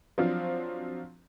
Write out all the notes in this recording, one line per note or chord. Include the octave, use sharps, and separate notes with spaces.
F3 F#3 C4 D4 F4